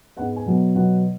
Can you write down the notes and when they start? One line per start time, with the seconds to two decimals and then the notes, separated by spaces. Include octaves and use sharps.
0.17 G#2 G#3 B3 F#5
0.36 G#5
0.46 B2 F#3 B3
0.75 B2 F#3 B3 F#5